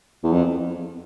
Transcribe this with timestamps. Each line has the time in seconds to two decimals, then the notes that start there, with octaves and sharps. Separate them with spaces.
0.23 E2
0.32 F2